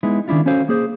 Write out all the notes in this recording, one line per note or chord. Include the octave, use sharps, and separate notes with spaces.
G#3 B3 D#4 E4
D#3 C#4 D4 E4 F4
C#4 F#4 A4 C5 F5
A#3 G#4 C5